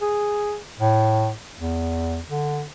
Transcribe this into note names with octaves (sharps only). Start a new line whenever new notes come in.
G#4
A2
E2
D3